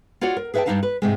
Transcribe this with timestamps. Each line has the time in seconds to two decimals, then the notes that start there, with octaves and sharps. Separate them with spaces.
0.21 F4 F#4 C#5 D5 F#5
0.37 A#4
0.54 G#4 B4 E5 F5 G5 A5
0.66 G2 E3 D4 D#4 F5 A5
0.83 B4
1.02 G#2 C3 G#3